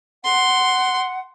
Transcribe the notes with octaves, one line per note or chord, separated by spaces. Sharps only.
F#5 C6